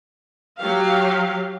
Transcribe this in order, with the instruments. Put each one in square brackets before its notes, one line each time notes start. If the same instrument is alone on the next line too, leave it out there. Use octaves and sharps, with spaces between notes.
[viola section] F#3 G4 F5